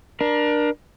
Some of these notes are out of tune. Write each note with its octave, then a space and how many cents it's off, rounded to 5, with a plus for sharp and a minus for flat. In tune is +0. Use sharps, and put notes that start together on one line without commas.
D4 +20 A#4 +30